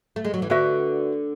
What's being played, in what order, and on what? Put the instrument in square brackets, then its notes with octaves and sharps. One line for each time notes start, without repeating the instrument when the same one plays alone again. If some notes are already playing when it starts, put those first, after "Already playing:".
[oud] A3
G#3
F#3
E3
[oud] D3 [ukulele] F#4 B4 E5